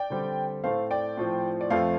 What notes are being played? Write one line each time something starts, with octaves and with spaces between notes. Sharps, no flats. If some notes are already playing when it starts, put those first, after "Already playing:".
Already playing: D5 G5
D3 G3 C4
A2 A3 C4 C5 F5
D5 G5
A2 F3 C4
D5
F2 F3 A3 C4 C5 F5